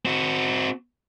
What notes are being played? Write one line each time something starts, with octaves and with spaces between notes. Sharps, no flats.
C4 F#4